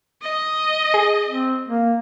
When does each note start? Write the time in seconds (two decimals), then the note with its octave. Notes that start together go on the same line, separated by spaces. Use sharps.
0.22 D#5
0.94 G#4
1.28 C4
1.69 A#3